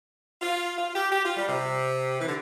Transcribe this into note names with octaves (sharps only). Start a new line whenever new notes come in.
F4
F4
G4
G4
F4
G3
C3
E3
D3